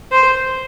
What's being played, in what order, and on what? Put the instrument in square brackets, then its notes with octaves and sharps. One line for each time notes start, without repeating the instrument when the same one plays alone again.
[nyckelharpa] C5